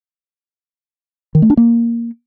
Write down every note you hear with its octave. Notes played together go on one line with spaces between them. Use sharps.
D#3
A3
D4
A#3